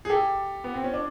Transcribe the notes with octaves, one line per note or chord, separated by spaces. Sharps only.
G#4
G4 A4
B3
C4
C#4
D4